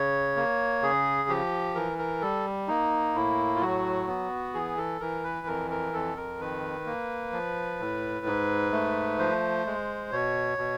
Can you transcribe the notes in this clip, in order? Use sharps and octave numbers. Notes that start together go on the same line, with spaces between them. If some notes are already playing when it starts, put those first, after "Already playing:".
Already playing: C#3 C#5
A#3
C#3 G#4
F3 G4
E3 A#4
A#4
G3 A4
A#3 D#4
A2 E4
F4
F#3 F#4
B3
E3 G#4
A4
E3 A#4
B4
F2 A#4
A#4
F2 A4
A#4
D#3 B4
A#3
F3
A2
G#2
A3
F3 C5
G#3
B2 C#5
B2